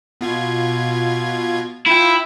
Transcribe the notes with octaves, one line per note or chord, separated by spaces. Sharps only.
B2 F4 G#6
E4 F4 G5